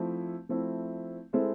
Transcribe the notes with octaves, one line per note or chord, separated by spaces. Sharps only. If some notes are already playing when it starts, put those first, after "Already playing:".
Already playing: F3 A3 C4 E4
F3 A3 C4 E4
G#3 C4 E4 A4 C5